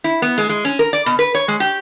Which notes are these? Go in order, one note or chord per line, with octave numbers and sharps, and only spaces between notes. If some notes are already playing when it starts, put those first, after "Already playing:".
E4
B3
G#3
G#3
C#4
A#4
D5
B2
B4
C#5
G#3
G4